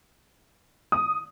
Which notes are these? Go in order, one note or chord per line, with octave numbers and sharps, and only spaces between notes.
D#6